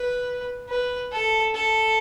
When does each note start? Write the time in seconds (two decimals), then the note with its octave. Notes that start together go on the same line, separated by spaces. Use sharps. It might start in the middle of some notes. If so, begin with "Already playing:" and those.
Already playing: B4
0.69 B4
1.11 A4
1.54 A4